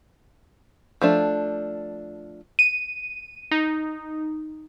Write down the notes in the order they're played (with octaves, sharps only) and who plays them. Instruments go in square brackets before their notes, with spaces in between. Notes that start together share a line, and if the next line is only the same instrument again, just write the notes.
[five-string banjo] F3 A3 D4
[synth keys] D#7
D#4